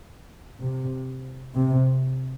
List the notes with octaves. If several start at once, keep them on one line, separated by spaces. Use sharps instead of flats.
C3
C3